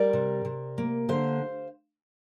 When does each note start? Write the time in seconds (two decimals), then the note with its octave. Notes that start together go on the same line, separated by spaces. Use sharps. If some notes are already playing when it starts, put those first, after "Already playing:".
Already playing: G3 A#4 D5
0.13 C3
0.45 C3
0.78 A#3
1.09 D3 C5 F5